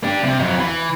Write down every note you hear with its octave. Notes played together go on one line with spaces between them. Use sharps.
D4 G4
C3
F2 F#3
E3